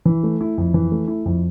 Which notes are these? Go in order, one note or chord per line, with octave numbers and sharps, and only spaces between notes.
E3
A3
E4
F2
E3
A3
E4
F2